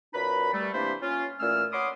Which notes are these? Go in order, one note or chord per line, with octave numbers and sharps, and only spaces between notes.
F#2 A#2 D#4 B4 B5
G3 A3
C3 E3 A#3 D4 C5 B5
C#4 F4
A#2 E3 A3 C#4 E6 F6
C#5 F#5 B5 C6 D6 D#6